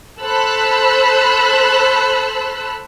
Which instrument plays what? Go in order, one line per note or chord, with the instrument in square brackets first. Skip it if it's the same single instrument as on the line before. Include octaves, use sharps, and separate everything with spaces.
[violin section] A4 C5 B5 E6 F#6